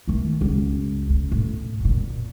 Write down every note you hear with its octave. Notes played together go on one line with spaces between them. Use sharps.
D#3 A3
C#2 F#2
C#3
A2
F#2 A#2